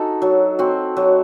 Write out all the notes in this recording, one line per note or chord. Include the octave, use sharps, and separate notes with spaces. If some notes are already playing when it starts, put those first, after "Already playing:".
Already playing: D#4 F#4 A4
F#3
C4 F#4
F#3